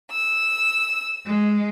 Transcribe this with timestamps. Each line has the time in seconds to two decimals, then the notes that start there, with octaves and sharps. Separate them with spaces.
0.11 E6
1.26 G#3